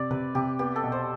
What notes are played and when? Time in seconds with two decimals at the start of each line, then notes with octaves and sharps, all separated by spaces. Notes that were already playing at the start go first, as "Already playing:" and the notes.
Already playing: C3 D5
0.11 C3 B4
0.35 C3 G4
0.59 B3 G4
0.76 A4
0.84 B2
0.92 C5